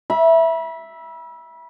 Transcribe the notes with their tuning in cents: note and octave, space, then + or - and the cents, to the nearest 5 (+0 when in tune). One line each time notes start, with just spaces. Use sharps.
E5 +0 B5 -35